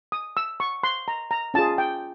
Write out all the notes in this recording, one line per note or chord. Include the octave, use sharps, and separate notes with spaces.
D#6
E6
C#6
C6
A#5
A#5
C#4 F4 G#4 A5
G5